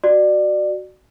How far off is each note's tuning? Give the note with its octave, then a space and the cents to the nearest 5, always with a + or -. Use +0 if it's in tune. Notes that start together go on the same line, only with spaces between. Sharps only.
F#4 +10 D5 +25